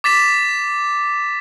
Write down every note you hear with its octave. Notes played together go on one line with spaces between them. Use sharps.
D6 A6 B6 E7